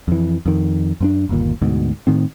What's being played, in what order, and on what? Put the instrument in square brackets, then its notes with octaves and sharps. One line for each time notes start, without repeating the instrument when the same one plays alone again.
[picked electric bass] F2 E3
F2 D#3
F#2 B3 D4
G1 D#2 A#2
D2 G#2 B2
A2 D#3 C4